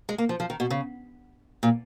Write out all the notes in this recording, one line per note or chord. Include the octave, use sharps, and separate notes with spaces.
G#3
A#3
F3
F3
D#3
B2
C#3
A#2